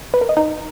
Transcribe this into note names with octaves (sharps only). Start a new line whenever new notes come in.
B4
A#4
D#5
D#4